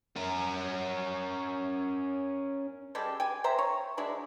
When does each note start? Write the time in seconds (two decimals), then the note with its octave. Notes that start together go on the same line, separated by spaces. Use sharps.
0.16 C#4 A#4
2.95 G3 G#3 G4 A4
3.20 G5 G#5
3.44 C5 E5 A#5
3.59 C#5
3.97 F#3 G#3 D4 E4